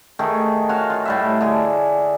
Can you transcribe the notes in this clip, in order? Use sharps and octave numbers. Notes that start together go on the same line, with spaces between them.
D#3 A3 G#4
F#4 C#5 F5
F4
A2 G3 E5
D3 G#4